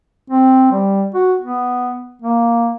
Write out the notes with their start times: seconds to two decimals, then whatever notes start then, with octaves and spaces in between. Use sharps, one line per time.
0.30 C4
0.72 G3
1.15 F#4
1.41 B3
2.22 A#3